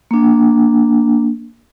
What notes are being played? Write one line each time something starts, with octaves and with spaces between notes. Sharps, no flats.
A#3 D4